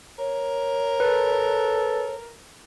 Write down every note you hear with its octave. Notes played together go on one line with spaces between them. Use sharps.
A#4 C#5
A4 B4